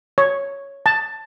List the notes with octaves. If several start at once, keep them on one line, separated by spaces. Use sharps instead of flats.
C#5
A5